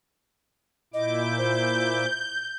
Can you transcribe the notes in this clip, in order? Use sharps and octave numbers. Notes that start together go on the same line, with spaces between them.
A#2 E4 D#5 D6 G6
C5